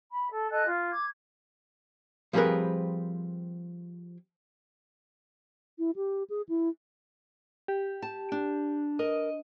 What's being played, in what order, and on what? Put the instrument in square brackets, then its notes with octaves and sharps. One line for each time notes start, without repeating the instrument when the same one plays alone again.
[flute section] B5
A4
A4 D#5 G#5 F#6
F4
D6 G#6
[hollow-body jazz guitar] F3 G3 C4 G#4 A#4 B4
[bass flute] E4
G4
G#4
E4
[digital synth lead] G4
[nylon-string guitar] A5
D4
[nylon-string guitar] A#4 [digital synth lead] D#5